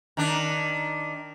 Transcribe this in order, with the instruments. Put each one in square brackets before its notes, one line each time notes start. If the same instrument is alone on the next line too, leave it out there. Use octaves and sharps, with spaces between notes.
[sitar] D#3 D4